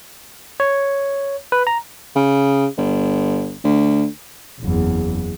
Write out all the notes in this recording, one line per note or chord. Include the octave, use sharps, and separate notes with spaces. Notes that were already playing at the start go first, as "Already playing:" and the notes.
C#5
B4
A#5
C#3
G1
D2
F#1 E2